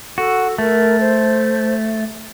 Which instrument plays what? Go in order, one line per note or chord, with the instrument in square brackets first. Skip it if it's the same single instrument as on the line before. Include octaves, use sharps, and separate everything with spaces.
[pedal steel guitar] F#4 [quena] A4
[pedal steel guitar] A3 [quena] A#4
[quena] C5